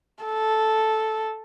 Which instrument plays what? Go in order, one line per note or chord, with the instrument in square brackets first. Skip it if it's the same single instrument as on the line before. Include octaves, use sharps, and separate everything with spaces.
[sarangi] A4